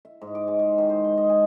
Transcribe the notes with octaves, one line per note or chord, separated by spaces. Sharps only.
E5
G#2
D6
G#3
G#3
D#3
C5
C6
D#5
G#5